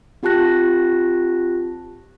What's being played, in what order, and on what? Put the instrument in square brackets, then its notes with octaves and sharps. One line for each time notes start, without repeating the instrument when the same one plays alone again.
[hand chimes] C4 F4 G4 A5 F#6 A#6